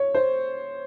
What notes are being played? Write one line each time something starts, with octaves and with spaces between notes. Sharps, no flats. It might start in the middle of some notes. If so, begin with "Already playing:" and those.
Already playing: C#5
C5